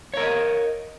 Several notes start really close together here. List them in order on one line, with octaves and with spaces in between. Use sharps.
C#5 A#4 D#5